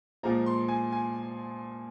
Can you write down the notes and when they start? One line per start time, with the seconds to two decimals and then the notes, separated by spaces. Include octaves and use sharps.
0.23 A#2 F3 G#3 A#5
0.46 C6
0.68 G#5
0.92 G#5